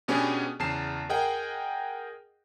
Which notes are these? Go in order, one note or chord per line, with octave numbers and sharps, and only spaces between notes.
B2 B3 C#4 D4 G4 G#4
E2 C#3 A5 C7 E7
G#4 A#4 D#5 F#5 G5